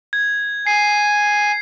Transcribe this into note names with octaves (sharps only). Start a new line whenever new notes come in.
G#6
G#5 C7